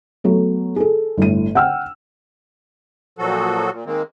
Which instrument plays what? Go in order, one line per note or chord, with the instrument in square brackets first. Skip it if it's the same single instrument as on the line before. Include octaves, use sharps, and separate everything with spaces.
[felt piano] F#3 A3 B3
G#4 A4
G1 A2 D#7
F#5 G5 E6 F6
[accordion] A#2 F3 F#3 F#4 A4
A#2
D#3 G#3 A#3 C4